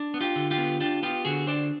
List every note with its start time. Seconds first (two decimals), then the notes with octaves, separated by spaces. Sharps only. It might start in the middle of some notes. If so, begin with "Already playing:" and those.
Already playing: D4
0.14 B3
0.21 F4 G4
0.36 D3
0.51 F4 G4
0.58 B3
0.80 D4 F4 G4
1.03 B3 F4 G4
1.25 D3 F#4 G#4
1.47 D4 C5 D5